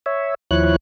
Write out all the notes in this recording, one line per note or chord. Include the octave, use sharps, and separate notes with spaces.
C#5 E5
D#2 F3 E4 C#5 F#6